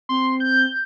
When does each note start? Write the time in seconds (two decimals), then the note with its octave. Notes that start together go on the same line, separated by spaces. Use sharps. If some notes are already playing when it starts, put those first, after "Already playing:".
0.09 C4 C6
0.40 G6